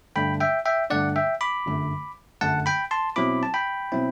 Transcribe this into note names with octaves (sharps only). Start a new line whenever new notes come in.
G2 D3 A3 D4 G5 B5
E5 G5
E5 G5
G2 D3 A3 D4 D5 F#5
E5 G5
B5 D6
G1 F#2 D3 A3
G1 F#2 D3 A3 F#5 A5
G5 B5
A5 C6
B2 F#3 C4 E4 B5 D6
A5
G5 B5
B2 F#3 C4 E4